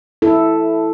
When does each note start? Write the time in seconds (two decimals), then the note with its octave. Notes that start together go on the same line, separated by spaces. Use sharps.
0.22 E4 A4